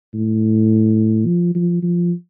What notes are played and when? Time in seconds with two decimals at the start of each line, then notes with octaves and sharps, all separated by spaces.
0.14 A2
1.26 F3
1.55 F3
1.83 F3